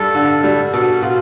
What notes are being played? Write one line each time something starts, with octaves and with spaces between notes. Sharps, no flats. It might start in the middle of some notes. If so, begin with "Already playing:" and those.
Already playing: G2 G3 A4
D3
G3
B2 A4
B2 F4